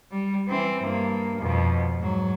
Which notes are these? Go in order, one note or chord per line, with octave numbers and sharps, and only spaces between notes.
G3
E3 C4
G2 A#3
F2 B2
G#2 F#3